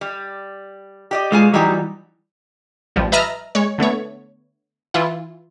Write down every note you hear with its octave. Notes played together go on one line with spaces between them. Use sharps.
G3
G4 D5 D#5
B2 G#3 F4 G#5
E3 F#3 G3 D#4 G4
A1 F3 G3
B4 D#5 E5 A5 A#5 F6
G#3 C#5
D3 A3 B3 C#5
E3 E4 F4